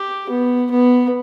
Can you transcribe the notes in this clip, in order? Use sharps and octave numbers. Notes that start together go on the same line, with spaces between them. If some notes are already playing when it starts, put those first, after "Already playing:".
Already playing: G4
B3
B3